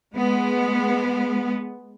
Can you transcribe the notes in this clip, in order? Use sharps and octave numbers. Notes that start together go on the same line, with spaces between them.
G#3 B3